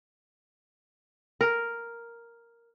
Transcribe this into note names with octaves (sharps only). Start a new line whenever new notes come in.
A#4